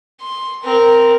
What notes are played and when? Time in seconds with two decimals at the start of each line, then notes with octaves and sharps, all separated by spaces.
0.20 C6
0.63 C4 A#4